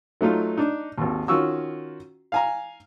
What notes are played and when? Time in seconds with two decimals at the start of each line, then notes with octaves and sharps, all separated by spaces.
0.21 F#3 A3 D#4 F4
0.58 D4 D#4
0.98 G#1 D#2
1.28 D#3 C#4 F4 F#4 C#6 E6
2.32 F5 G#5 A#5